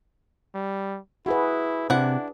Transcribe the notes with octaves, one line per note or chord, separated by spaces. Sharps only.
G3
E4 F#4 G#4 B4
C3 D4 E4 F#5